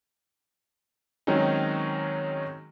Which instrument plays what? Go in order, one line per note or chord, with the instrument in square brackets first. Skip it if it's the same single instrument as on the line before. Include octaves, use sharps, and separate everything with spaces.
[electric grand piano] D#3 F#3 G#3 C4 C#4 D#4